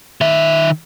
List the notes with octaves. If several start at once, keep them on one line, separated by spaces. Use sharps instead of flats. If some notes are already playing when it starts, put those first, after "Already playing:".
D#3 E5